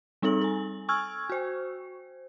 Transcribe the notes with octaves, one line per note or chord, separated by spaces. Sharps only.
G3 C4 D#4 A4 F#7
A4 G#5
G#5 C#6 E6 F6 G#6
F#4 C5